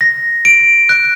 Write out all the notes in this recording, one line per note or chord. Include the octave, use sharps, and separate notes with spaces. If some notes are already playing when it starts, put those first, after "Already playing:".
A#6
D7
F#6